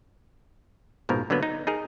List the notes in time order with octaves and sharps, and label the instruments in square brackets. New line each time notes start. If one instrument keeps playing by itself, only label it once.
[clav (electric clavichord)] A#1 G#2 B2 F3 A#4
D3 F#3 A#3 B3 B4
D#4
D#4 G#4 A#4